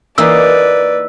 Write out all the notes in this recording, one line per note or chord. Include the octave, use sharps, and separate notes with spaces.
E3 A#3 D#4 B4 D5 E6